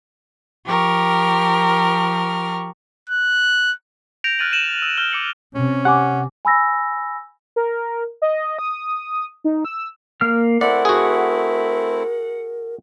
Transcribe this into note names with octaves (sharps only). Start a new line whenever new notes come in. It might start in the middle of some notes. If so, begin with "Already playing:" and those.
F3 G4 A#4 C#6 F6
F#6
G6 A#6 D7 F7
F6 F#6 A6 D#7 F#7
D#7 E7 F#7
E6
F6 G6 G7
D6 C#7 F#7
C3 C#4
G4 F#5 G#5 D6
G#5 B5 E6 A#6
A#4
D#5
D#6
D#4
E6
A#3 F6
A3 C4 E4 A#4 D5 F#5
F#4 G#4